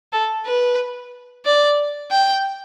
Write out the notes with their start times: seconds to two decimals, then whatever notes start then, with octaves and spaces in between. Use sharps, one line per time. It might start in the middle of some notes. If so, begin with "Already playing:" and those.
0.13 A4
0.46 B4
1.46 D5
2.11 G5